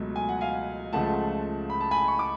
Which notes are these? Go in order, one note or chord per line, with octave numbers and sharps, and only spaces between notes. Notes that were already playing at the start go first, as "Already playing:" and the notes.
Already playing: C#2 B2 F#3 A3
G#5
F#5
F5 G#5
C#2 C#3 F3 A3 F#5 A5
B5
A5
G#5 B5
C#6
D6